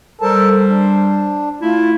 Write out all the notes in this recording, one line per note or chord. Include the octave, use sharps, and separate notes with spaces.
G3 A4 A#4 C5 A5
D4
A3 E4 F4